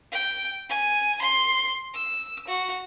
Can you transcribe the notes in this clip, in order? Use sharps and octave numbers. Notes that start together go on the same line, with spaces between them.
G5
G#5
C6
E6
F#4